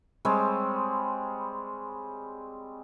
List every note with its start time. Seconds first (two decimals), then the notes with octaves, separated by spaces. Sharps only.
0.25 G3 G#3 C4 C#5